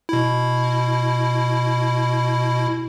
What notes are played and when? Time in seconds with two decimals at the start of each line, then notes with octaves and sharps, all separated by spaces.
0.09 B2 E4